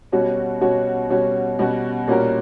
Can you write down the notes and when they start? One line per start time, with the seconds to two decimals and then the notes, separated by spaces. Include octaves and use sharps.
0.12 B2 G3 C#4 F#4 C#5
0.61 B2 G3 C#4 F#4 C#5
1.10 B2 G3 C#4 F#4 C#5
1.59 B2 G3 C#4 F#4 C#5
2.08 A#2 G3 C#4 F#4 A#4